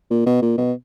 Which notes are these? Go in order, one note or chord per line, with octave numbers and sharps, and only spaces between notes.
A#2
B2
A#2
B2